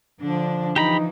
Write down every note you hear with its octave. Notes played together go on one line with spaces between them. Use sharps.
D3 F3 D4
E3 F3 D#4 G4 A#5 B5